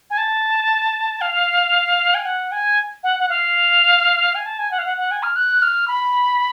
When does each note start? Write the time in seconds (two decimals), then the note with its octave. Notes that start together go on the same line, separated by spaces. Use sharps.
0.10 G#5
0.17 A5
1.21 F5
2.14 G#5
2.25 F#5
2.51 G#5
3.03 F#5
3.19 F#5
3.29 F5
4.34 G#5
4.45 A5
4.58 G#5
4.70 F#5
4.78 F5
4.85 F#5
4.97 F#5
5.11 G#5
5.22 F6
5.35 F#6
5.62 F6
5.87 B5